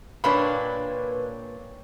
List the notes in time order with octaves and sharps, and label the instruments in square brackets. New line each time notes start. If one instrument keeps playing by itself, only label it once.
[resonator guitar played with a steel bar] A#2 A#3 D4 [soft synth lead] B4 [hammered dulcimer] C#5 G5 G#5 [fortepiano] B5